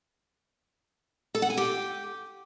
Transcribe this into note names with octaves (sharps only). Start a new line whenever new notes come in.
A4
F#5
G#5
G4